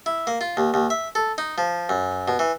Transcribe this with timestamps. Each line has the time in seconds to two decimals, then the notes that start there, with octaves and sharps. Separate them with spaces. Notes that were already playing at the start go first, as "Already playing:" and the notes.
0.06 E4
0.27 A#3
0.41 F4
0.57 D#2
0.74 D#2
0.90 E5
1.15 A4
1.38 D#4
1.58 F3
1.89 F#2
2.28 B2
2.39 E3